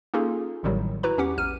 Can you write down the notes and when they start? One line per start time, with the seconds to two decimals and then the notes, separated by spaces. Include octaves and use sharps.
0.14 A#3 C#4 D#4 F4 G#4 A4
0.63 A1 A2 C3 D#3 F#3 G3
1.03 E4 F#4 B4 A#5
1.18 E2 C#4 G4 F#5 D6
1.38 A#1 F6 D#7